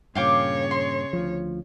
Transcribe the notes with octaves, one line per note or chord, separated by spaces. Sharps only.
G2 A#2 C#3 C#5 F5 G5 D6
C6
D2 F3